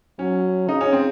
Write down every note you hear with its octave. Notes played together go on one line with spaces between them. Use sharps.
F#3 C#4
C#3 D#4
C#4
C4